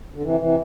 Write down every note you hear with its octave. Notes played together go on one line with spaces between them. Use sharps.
D3
C3 E3
C3 E3